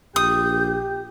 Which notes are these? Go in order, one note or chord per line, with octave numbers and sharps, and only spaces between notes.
A#1 G4 D#6 G6